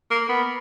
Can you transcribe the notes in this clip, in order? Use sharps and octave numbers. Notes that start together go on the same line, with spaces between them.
A#3
B3